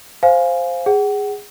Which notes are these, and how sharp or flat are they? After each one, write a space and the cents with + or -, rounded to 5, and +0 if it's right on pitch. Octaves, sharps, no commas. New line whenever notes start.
C5 +0 F5 +0 G#5 +5
G#4 -15 F#5 +30